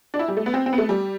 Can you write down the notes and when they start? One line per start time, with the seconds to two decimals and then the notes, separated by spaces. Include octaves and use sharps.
0.14 D4
0.19 E4
0.28 G3
0.37 A3
0.46 B3
0.54 C4
0.66 C4
0.73 B3
0.78 A3
0.89 G3